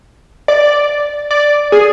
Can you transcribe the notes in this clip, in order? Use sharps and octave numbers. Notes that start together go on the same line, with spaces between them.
D5
D5
G#4